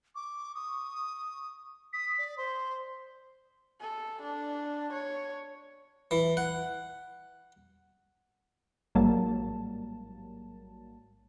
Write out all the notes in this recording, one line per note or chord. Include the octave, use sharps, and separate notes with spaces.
C#6 D6
D#6
D#6 B6
D5
C5 C6
A4
D4
C#5
E3
F#5
A1 G#2 F#3 G3 A#3 A5